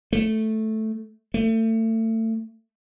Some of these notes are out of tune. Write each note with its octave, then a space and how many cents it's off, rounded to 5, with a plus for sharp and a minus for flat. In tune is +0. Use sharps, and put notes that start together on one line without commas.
A3 -5
A3 +30